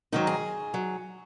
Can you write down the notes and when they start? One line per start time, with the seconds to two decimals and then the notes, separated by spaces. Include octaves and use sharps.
0.12 G#2 D#3 F#3 D#4
0.27 G#4
0.74 F#3